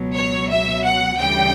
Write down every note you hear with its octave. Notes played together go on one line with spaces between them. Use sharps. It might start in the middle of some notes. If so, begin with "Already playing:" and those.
Already playing: C#2 B2 F#3
C#5
E5
F#5
D2 C#3 E3 G3 G5